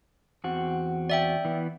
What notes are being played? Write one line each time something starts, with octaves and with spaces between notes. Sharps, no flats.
E2 C4 F#4
D5 E5 G5
E3 B3